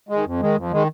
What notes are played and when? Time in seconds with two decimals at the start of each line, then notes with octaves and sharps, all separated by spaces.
0.09 D#3 G#3
0.25 F2
0.40 D#3 G#3
0.56 F2
0.72 D#3 G#3